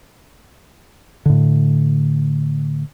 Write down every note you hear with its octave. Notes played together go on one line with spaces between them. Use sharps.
A2 D3